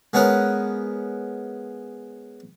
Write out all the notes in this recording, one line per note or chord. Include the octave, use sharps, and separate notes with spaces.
G#3 B3 C#4 A#4 F#5